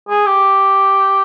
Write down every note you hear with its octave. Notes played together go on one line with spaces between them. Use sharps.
G#4
G4